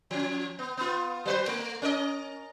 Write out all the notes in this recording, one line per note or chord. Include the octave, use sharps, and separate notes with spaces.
F3 C#4
B3
B3 F4
F#3 B4 C5
A3
C#4 A#4 D#5